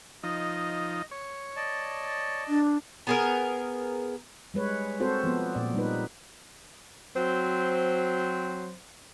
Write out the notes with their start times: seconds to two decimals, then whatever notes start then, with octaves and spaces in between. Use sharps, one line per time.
0.23 F3 D#4 D#5
1.11 C#5
1.56 D5 D#5 A5
2.48 D4
3.07 B3 G#4 A#4
4.54 G3 G#3 B4 C#5
5.00 C4 F#4 A4 C5
5.24 F3 B3
5.55 A#2 D5
5.74 G3 D#4 B4
7.15 F#3 C4 C5